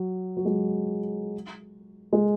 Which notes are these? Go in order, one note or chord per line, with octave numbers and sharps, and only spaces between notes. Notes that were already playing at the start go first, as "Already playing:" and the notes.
Already playing: F#3
F#3
G#3
G#3